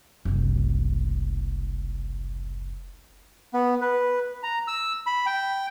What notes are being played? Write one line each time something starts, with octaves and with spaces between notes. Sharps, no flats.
F#1 C2
B3
B4
A#5
E6
B5
G5